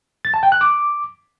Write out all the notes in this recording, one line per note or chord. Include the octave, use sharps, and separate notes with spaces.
A6
A5
G5
F#6
D6